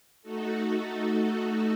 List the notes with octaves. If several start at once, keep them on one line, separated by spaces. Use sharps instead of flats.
A3 D#4 F#4 A4